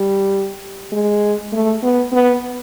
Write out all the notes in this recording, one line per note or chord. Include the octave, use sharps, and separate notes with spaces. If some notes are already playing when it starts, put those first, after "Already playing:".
Already playing: G3
G#3
A3
B3
B3